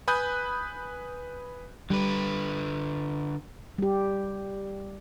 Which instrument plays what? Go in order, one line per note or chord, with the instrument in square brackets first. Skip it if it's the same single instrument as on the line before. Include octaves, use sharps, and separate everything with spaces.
[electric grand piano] B4 G#5 B5 D#6 F#6 G6
[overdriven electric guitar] D3 B4 [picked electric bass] G3
[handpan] G3 G4